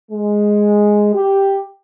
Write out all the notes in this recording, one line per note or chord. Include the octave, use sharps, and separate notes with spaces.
G#3
G4